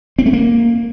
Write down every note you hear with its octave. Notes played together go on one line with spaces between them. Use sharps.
C4
A3
A#3